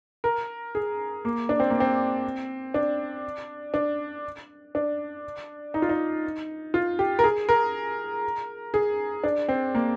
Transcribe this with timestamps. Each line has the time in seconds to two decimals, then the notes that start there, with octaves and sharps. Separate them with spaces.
0.24 A#4
0.75 G#4
1.25 A#3
1.49 D4
1.60 C4
1.70 A#3
1.80 C4
2.74 D4
3.74 D4
4.75 D4
5.74 D#4
5.82 F4
5.89 D#4
6.74 F4
6.99 G4
7.19 A#4
7.24 G#4
7.49 A#4
8.74 G#4
9.24 D4
9.49 C4
9.75 A#3